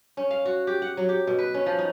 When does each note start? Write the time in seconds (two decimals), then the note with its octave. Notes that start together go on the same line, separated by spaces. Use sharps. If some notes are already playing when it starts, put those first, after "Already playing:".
0.17 C#4
0.31 F5
0.45 F#4
0.67 G4
0.82 F#5
0.97 F#3
1.09 G4
1.27 B2
1.39 B4
1.54 C#4
1.66 F3
1.79 D#4